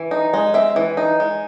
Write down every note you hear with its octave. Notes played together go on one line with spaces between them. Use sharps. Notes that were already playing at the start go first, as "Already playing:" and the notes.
Already playing: E3
D#4
G#3
C4 E5
E3
D#4
G#3